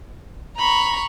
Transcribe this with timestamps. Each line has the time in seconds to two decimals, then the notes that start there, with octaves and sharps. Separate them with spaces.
0.58 A#5 B5 C#6